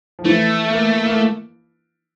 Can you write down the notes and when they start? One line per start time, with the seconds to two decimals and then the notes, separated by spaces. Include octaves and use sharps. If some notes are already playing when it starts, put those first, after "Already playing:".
0.19 F3
0.25 E3 A3
0.71 A#3
1.06 A#3